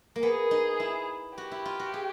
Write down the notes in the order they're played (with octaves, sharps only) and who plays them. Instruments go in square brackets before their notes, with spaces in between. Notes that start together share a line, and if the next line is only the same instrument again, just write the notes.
[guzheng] A#3
[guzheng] B3 [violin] G#4
[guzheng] D#4
E4
[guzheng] F#4 [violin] G4
[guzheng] E4
F4
F#4
G#4